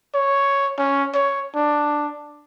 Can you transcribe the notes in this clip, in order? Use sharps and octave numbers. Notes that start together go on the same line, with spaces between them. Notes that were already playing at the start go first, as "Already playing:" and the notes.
C#5
C#4
C#5
D4